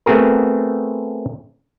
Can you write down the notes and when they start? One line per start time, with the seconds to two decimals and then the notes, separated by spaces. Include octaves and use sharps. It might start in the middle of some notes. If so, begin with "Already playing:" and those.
0.06 A3 B3 C4 F#4 G#4 A#4